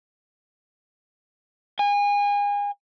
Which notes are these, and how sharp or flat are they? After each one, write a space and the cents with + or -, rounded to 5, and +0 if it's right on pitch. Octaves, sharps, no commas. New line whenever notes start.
G#5 -30